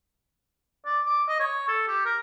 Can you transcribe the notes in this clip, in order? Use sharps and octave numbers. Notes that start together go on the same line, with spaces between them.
D5
D6
D#5
C#5
A4
G4
A#4